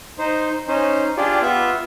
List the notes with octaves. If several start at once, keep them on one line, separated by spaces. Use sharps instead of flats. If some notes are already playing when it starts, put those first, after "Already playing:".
D#4 C5
C#4 D#4 C5
D4 F4 G4 G#4 D5
B3 F4 E5